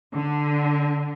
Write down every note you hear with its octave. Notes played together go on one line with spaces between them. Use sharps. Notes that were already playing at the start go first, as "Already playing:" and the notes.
D3